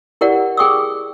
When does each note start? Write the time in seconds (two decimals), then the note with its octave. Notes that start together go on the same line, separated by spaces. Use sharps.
0.21 E4 G4 A#4 D5 F#5
0.57 G#4 G5 C#6 D#6 E6